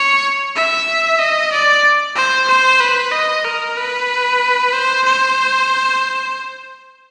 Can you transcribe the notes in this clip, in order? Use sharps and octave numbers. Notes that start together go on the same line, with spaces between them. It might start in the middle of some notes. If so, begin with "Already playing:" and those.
Already playing: C#5
E5
D#5
D5
C5
C5
B4
D#5
A#4
B4
C5
C5